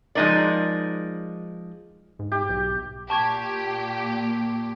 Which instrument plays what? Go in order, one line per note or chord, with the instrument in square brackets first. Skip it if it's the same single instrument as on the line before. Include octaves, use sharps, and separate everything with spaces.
[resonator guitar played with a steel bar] F3 G#3 A#3 D#4 A#4 D5
[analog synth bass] G#2
[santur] G4
[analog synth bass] B1
[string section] A#2 G4 [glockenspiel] A5 C#6 G#6